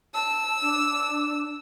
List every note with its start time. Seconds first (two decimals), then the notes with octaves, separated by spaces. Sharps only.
0.14 A5 E6
0.62 D4